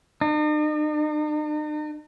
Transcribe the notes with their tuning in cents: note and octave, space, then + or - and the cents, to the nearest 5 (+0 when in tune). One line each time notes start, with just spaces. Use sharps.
D#4 -45